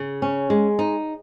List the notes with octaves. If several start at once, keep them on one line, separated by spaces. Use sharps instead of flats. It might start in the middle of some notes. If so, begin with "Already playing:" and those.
Already playing: C#3
C#4
G#3
D#4